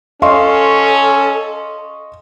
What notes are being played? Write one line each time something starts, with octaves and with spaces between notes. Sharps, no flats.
C#4 A4 D#5 F5 C6 C#6